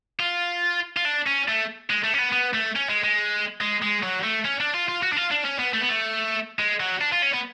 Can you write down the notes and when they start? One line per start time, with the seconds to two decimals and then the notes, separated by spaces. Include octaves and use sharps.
0.20 F4
0.97 F4
1.05 D4
1.26 C#4
1.48 A3
1.90 G#3
2.04 A3
2.14 C#4
2.19 B3
2.32 B3
2.54 A3
2.76 C#4
2.89 G#3
3.04 G#3
3.61 G#3
3.82 G#3
4.03 F#3
4.24 A3
4.45 C#4
4.60 D4
4.74 F4
4.88 F4
5.03 F#4
5.12 D4
5.17 F4
5.31 D4
5.45 C#4
5.59 B3
5.73 A3
5.81 B3
5.89 A3
6.59 G#3
6.80 F#3
7.01 D4
7.12 F4
7.22 C#4
7.33 B3